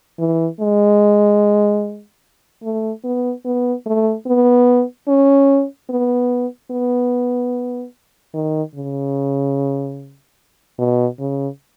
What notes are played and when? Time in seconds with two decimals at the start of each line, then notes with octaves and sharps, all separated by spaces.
0.19 E3
0.61 G#3
2.63 A3
3.05 B3
3.45 B3
3.86 A3
4.27 B3
5.08 C#4
5.90 B3
6.71 B3
8.34 D#3
8.75 C#3
10.79 B2
11.20 C#3